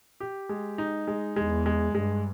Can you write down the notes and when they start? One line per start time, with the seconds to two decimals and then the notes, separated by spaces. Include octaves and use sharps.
0.20 G4
0.49 G#3
0.78 D#4
1.07 G#3
1.36 E2 G#3
1.66 G#3
1.94 G2 G#3